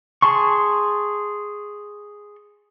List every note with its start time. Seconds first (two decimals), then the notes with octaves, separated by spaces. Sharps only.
0.22 G#4 A5 C6 C#6